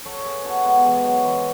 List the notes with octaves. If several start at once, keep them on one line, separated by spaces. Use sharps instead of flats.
A4 C#5
G#4 B4
F#4 A4
G#3 B3
E3 G#3
F#3
E3 G#3